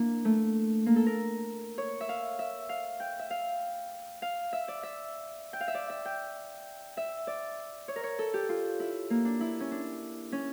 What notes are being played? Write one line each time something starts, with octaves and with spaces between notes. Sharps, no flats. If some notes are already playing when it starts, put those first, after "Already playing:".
Already playing: A#3 D4 E4
A3
A#3
A4
A#4
C#5
E5
F5
E5
F5
G5
E5
F5
F5
E5
D5
E5
G5
F5
E5
D5
E5
G5
E5
D5
C#5
A#4
C#5
A4
G4
F4
E4
A#3
D4
E4
C#4
D4
C#4